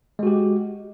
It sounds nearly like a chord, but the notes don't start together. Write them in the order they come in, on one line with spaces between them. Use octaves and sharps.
G#3 F#4 G4